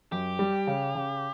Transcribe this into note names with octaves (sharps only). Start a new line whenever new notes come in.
F#2 G4
G3
C#3
C#3